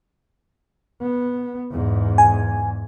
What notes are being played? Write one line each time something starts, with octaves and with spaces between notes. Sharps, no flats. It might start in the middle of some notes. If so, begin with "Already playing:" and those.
B3
E2 G#2
G#5